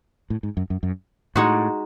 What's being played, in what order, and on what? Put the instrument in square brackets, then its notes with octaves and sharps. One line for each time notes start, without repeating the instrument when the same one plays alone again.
[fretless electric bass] A2
G#2
F#2
F#2
F#2
[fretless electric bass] A2 [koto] G#3 D#4 F#4